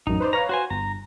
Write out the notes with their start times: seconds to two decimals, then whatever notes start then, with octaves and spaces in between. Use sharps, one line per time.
0.07 A1 F#2 D#4
0.20 B4 C5 D5
0.33 B4 C#5 F5 A#5
0.49 F#4 C5 G#5
0.70 G1 A#5